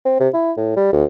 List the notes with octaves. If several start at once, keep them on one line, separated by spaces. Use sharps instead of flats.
C4
C3
E4
A2
G3
D2